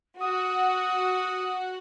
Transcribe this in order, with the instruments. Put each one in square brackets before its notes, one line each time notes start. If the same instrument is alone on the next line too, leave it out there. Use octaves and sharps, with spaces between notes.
[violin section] F#4 F#5 [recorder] D#6